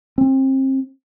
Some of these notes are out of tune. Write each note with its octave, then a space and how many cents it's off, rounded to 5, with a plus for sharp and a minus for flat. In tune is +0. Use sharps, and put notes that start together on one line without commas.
C4 +30